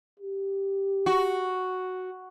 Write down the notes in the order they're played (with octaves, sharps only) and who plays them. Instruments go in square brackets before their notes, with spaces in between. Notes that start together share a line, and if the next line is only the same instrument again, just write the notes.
[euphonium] G4
[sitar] F#4